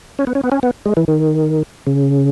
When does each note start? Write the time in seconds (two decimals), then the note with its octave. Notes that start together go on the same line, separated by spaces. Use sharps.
0.19 C#4
0.27 B3
0.35 C#4
0.44 B3
0.52 C#4
0.63 B3
0.86 G#3
0.97 E3
1.08 D#3
1.87 C#3